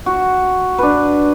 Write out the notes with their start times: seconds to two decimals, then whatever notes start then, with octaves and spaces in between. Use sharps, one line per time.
0.06 F#4
0.78 D4 B4